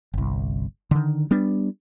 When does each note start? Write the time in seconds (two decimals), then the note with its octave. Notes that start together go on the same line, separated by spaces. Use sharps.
0.14 G1 C2
0.91 D3 D#3
1.31 G3 B3 D4